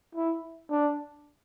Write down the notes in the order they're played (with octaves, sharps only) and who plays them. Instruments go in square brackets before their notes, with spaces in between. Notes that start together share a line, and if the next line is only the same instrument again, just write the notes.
[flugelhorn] E4
D4